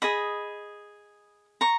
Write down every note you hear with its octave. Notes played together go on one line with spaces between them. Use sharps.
G#4 D#5 B5 D#6
A#5 C#6